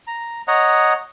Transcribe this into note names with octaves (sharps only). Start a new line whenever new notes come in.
A#5
C#5 D#5 F#5 A#5